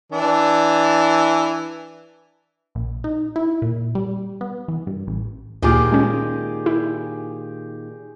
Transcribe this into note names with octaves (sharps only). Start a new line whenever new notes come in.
E3 D4
A#1
D#4
E4
A#2
G3
B3
E3
G2
A1
D2 A#2 D#3 F4 G4 G#4 F6
G#3 C#4
E4